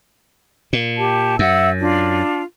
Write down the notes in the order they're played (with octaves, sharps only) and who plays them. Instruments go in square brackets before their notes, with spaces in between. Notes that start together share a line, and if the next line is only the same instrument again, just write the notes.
[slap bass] A#2
[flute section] G4 A5
[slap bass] F#2 [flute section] E5 F#5 E6
[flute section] D4 F4